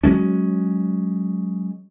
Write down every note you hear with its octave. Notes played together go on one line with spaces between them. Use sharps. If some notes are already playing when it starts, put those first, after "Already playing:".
F#3 G#3 C#4